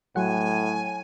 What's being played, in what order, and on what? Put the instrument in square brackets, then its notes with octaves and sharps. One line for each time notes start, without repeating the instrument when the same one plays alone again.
[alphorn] A2 [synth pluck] F#3 F#5 [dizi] G#5